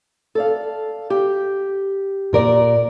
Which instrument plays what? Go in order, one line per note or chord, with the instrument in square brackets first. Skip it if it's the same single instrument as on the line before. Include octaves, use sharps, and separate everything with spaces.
[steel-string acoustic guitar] A4 D5 F5
G4
[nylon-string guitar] A#2 A#4 D5